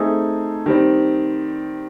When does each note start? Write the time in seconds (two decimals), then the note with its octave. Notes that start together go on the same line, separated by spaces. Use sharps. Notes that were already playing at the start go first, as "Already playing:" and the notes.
Already playing: A3 C4 D#4 G#4
0.66 D#3 G3 C4